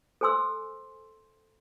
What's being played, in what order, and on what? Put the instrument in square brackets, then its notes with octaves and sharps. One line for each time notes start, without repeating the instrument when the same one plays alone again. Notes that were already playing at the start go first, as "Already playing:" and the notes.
[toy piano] A4 C5 G#5 C6 E6